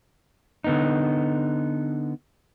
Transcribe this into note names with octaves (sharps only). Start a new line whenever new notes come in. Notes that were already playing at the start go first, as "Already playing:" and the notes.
D3 B3 D#4